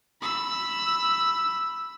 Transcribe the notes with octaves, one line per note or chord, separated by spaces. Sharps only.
B5 E6